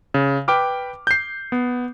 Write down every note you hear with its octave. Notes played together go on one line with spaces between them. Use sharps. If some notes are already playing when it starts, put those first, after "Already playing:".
C#3
B4 G5 B5 D6 F6
G6 C7
B3